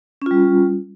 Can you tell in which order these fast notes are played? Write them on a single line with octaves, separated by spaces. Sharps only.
C#4 F4 G3